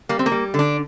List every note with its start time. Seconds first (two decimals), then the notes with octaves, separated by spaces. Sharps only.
0.09 G3 A#3
0.19 C4
0.26 A#3
0.32 G3
0.54 D3 D4